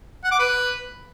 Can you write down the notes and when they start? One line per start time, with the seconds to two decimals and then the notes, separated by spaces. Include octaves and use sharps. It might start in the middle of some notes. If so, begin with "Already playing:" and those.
0.24 F#5
0.32 D6
0.39 B4